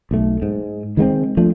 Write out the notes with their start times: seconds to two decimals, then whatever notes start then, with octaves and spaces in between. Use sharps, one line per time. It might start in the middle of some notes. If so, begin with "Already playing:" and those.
0.11 B1 A3
0.42 G#2
0.97 D#3 G#3 A#3 C4
1.37 F3 A3 D4